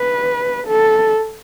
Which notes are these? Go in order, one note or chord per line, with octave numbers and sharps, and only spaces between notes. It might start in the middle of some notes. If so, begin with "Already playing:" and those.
Already playing: B4
A4